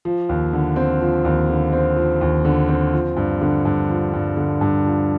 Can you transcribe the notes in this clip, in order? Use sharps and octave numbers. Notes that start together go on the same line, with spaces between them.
F3
D#2
D3
C4
F3
D#2
D3
C4
F3
D#2
D3
C4
F3
G2
D3
G2
F3
G2
D3
G2
F3